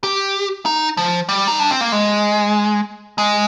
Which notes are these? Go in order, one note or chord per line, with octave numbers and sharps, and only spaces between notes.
G4
D#4
F3
G3
D#4
D4
C4
A#3
G#3
G#3